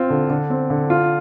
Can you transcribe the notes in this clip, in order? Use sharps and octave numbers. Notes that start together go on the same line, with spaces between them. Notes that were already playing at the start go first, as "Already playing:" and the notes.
Already playing: C4 F4
D3
D3
C4
D3
F4